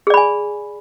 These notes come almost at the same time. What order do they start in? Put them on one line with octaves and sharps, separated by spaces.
G#4 D5 B5 G#5